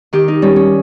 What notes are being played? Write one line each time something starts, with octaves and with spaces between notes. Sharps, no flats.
D#3 G4
D#4
G3 C#4
C#4